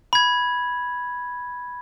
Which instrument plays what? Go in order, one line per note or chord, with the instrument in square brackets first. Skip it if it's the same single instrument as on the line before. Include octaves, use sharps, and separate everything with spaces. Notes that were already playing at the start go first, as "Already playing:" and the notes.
[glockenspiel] B5 G#6